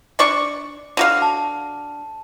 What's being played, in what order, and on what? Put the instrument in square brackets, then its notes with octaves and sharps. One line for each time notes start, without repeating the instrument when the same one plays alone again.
[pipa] D4 D5 C#6
D3 F#4 F5
[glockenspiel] A5